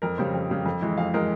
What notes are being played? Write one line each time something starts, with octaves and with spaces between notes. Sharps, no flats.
F2 A#4
C#3 G3 C5
F2
C#3 G3
F2
E3 G#3
F2 F5
E3 G#3 A#4